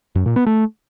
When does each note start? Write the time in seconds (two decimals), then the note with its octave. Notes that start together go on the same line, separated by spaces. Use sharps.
0.16 F#2
0.26 A#2
0.36 B3
0.46 A3